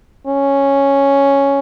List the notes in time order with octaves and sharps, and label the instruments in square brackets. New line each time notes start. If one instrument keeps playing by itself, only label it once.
[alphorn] C#4